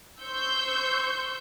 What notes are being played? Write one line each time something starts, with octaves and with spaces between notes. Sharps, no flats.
C5 C6 C#6 E6 G6